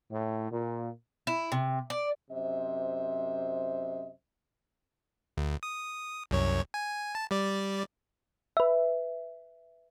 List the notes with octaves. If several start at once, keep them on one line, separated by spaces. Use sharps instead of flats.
A2
A#2
E4
C3
D5
F#2 C3 C5 D#5 E5
D2
D#6
C2 F#2 C#5
G#5
A5
G3 D5
B4 E5